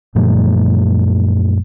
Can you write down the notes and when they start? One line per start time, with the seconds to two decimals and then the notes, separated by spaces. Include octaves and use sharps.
0.15 F#2 A#2 F3 A3